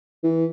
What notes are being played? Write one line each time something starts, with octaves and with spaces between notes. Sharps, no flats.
E3